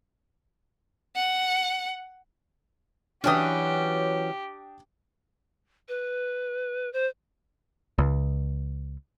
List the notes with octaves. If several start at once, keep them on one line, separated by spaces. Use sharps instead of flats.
F#5
E3 F#3 C#4 D4 G4 G5 D#6
B4
C5
C#2